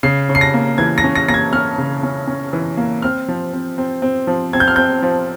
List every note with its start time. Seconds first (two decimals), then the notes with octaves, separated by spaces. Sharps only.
0.03 C#3 C7
0.29 C#3
0.35 C7
0.41 A#6
0.54 A#3
0.78 E3 G#6
0.98 A#6
1.04 C#4
1.16 A#6
1.28 A#3 A#6
1.34 G#6
1.53 C#4 F6
1.78 C#3
2.03 C#4
2.28 C#4
2.53 E3
2.77 A#3
3.02 C4 F6
3.28 F3
3.53 C4
3.78 C4
4.02 C4
4.27 F3
4.53 C4 G#6
4.60 G6
4.68 F6
4.76 C4 G6
5.02 F3